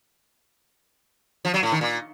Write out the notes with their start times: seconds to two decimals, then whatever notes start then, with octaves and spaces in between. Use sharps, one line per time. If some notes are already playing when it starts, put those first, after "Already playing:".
1.45 F3
1.54 F#3
1.63 A2
1.72 D#3
1.81 A#2